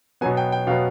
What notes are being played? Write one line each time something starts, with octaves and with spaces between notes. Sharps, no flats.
B2 F#3 B3 G#5
G5
G5
B2 F#3 B3 F5